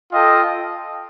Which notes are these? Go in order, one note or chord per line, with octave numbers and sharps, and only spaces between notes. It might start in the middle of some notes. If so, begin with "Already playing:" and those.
F4 A4 D#5 G5